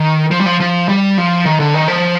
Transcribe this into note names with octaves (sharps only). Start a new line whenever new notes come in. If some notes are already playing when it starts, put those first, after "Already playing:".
Already playing: D#3
F3
G3
F3
F3
G3
F3
D#3
D3
D#3
F3